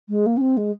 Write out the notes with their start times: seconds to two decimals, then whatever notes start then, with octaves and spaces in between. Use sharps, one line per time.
0.09 G#3
0.26 A#3
0.37 C#4
0.41 C4
0.57 G#3